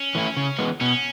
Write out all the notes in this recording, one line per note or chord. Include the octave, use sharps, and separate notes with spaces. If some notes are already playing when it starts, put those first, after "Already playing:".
Already playing: C#4
E3 A3 E4
C#3
E3 G#3 B3
B2 C#4